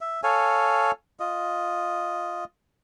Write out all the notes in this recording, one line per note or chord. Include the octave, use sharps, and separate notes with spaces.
E5
A4 C#5 F5 G#5
F4 D#5